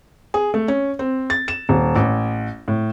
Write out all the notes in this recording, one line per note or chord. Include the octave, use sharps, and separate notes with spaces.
G#4
A3
C#4
C4
A6
E7
D#1
A1
A2